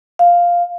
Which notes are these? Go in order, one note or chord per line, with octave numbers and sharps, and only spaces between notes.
F5